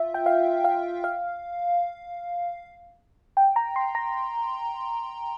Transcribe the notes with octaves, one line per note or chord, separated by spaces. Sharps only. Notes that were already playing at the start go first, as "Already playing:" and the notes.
Already playing: F4 E5
G5
F5
F5
F5
G5
A#5
C6
A#5